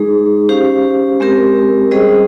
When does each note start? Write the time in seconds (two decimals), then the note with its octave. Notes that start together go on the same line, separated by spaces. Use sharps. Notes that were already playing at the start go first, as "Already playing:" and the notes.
Already playing: G#3 D#4 G#4
0.49 C#4 G4 C5 F5
1.20 G#3 C4 G4 A#4
1.91 G3 C#4 G#4 C5 D#5